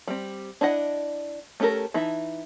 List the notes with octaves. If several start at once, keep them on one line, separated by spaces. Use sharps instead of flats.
G3 C4
D4 E4 D#5 F#5
A3 C#4 G4 A4 A#4
E3 D#4 E5 A5